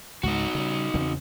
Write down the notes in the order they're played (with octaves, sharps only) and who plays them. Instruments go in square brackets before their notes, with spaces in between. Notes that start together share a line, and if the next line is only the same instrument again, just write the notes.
[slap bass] C#2 G#2 [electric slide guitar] D#4 F#4
[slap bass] C#3 G3
E2 C#3 C4